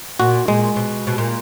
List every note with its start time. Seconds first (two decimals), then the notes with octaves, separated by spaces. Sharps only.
0.20 A#2 F#4
0.48 A#2 G#3
0.76 B2
1.07 B2
1.18 A#2